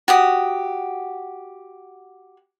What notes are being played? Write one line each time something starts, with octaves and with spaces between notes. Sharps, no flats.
F#4 G4 D#6